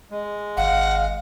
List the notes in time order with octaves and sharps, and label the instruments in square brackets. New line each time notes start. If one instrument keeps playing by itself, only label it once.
[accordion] G#3
[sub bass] G#1 [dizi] F5 [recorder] F#5